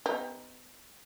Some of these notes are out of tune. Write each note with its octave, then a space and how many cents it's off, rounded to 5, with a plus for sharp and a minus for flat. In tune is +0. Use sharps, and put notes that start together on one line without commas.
B3 +30 D#4 +0 G4 +35